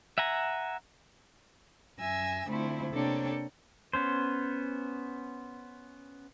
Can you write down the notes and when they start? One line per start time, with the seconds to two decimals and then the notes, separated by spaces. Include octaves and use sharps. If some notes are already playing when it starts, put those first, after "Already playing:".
0.18 E5 F#5 G#5 A#5
1.99 F#2 E5 G#5 E6 A#6
2.47 D3 F3 A3 C4 E4
2.93 C3 A#3 D4 A4 C#5 G5
3.93 B3 C#4 C5